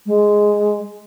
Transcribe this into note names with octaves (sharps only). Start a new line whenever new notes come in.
G#3